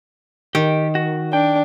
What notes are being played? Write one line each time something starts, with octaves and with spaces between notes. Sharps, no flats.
D#3 G4
F#4
D4 G5